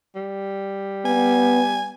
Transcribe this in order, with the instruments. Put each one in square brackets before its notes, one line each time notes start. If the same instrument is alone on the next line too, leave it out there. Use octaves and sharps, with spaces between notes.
[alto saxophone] G3
[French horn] B3 [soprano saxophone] G#5